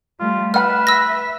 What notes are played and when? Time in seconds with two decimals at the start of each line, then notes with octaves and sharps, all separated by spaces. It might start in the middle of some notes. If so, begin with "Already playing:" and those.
0.20 G3 A3 F4
0.54 B4 D#5 E5 F#5 B5 F6
0.87 E6 A#6